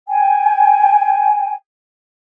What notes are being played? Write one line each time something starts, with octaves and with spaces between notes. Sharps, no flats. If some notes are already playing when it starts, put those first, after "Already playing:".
G5 G#5